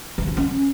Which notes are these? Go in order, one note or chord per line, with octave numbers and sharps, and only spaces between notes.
E3
F3
C#4